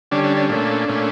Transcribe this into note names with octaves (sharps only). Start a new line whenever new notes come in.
D3 G3 C#4 D4
D4
D4
A#2 A3 C#4 D4
A#2 A3 C#4